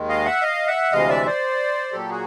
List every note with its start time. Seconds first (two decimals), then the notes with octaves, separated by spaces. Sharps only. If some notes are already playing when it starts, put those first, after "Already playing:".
Already playing: D#2 D#3 G#3
0.09 D#5 F5
0.25 E5 F#5
0.42 D#5 F5
0.67 E5 F#5
0.92 D2 C3 E3 G#3 D#5 F5
1.09 D5 E5
1.26 C5 D5
1.92 A#2 F#3 A#3 G4 A4
2.10 F#4 G#4